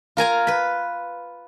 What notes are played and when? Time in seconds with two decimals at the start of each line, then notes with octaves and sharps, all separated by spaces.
0.17 F4 A#4 G#5 A#5
0.47 B4 B5